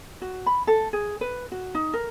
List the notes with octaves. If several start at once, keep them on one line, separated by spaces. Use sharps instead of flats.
F#4
B5
A4
G#4
B4
F#4
D#4
A#4